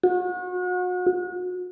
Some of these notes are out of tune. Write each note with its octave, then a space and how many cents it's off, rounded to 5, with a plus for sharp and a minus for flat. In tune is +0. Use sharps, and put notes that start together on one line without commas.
F#4 -35